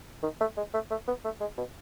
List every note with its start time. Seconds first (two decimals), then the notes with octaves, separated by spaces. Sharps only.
0.23 D#3
0.41 A3
0.57 G#3
0.74 A3
0.90 A3
1.08 B3
1.24 A3
1.41 G#3
1.58 B2